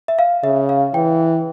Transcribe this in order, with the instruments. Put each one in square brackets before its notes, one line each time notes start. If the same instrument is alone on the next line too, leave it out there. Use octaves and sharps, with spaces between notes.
[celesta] E5
F5
[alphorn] C#3 [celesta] E5
[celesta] F5
[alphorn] E3 [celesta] G5